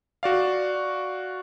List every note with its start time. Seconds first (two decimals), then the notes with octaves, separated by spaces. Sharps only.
0.23 F#4 D5 F5